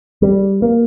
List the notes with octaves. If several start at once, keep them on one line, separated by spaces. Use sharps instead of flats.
G3
A#3